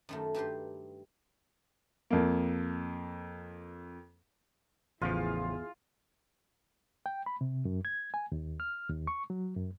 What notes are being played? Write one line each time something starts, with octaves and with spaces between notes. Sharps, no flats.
F#2 D#3 A3
G2 G4 B4 C6
F2 A#3
A1 E2 C#3 F3 E4 F4 G#4
G5
B5
C3
F#2
G#6
G#5
D#2
F6
D#2
C#6
F#3
F#2